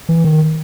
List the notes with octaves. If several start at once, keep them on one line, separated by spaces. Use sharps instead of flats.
E3
D#3